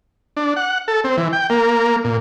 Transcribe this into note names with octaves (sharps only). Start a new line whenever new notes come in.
D4
F#5
A4
C4
E3
G5
A#3
A#2